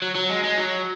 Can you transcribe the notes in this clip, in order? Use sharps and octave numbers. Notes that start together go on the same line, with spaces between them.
F#3
F#3
G#3
G#3
F#3